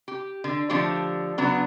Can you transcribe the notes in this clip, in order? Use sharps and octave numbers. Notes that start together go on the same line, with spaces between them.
G4
D3
D3 F3 A3 D4 G4 C#5
C#3 F#3 B3 D4